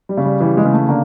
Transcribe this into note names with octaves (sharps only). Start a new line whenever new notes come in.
G3
C#3
G3
E3 G3
G#3
C#3
A3
D3 A#3